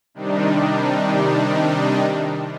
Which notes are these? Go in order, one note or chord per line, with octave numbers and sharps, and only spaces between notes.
C3 D#3 G3 D4 D#4